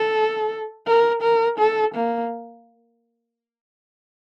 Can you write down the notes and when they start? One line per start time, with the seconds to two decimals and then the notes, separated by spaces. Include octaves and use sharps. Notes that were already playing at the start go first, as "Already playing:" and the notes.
Already playing: A4
0.86 A#4
1.22 A#4
1.59 A4
1.95 A#3